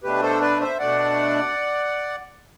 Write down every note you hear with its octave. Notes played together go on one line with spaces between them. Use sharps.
B2 A3 D4 G4 B4
A4 C5
B4 D5
C5 E5
B2 A3 D4 D5 F#5